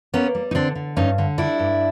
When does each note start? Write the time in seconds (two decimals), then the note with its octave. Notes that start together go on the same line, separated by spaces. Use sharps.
0.14 A#3 B3 C#4
0.35 G3
0.51 D#4
0.55 D3 C4 D4
0.75 D3
0.97 G2 C#4 D#4
1.18 D3
1.38 G3 D4 E4
1.59 G2